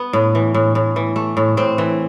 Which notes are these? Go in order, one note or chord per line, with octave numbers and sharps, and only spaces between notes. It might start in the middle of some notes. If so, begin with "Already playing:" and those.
Already playing: B3
A2
E3
A2
A2
E3
A3
A2
A2 C4
E3